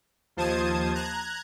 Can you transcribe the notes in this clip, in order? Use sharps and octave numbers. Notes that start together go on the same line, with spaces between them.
D#2 F3 C5 A5 D#6 G#6
A#5 F#6 G#6